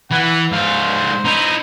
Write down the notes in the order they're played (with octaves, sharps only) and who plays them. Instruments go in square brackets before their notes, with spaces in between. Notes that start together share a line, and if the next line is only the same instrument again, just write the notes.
[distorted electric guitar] E3 [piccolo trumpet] F#5
[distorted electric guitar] G#2 F5 [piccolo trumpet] C5
[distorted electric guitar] D#4 E4